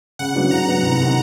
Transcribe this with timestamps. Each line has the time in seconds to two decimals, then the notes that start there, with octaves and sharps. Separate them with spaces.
0.19 C#3 F#5
0.35 F#3 B3 D4
0.51 C#3 A#5
0.67 F#3 B3 D4
0.83 C2
0.99 C3 D#3